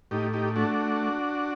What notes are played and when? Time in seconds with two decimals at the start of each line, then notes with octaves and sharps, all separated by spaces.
0.11 A2 D#4 G4
0.33 D#4 G4
0.55 A3 D4 F#4